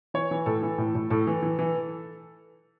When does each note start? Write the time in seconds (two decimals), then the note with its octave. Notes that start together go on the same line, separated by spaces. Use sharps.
0.14 E3 C#5
0.31 E3
0.46 A2 A4
0.63 E3
0.78 A2
0.95 A2
1.10 A2 A4
1.27 E3
1.43 E3
1.59 E3